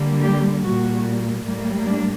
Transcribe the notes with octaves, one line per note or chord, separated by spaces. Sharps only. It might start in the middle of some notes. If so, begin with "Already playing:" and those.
Already playing: D3 G3 A#3
G4
A#2 G3 A#3 F#4
A2 G3 A#3
D4